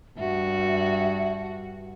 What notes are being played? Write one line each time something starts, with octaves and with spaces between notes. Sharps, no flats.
G2 F#4 E5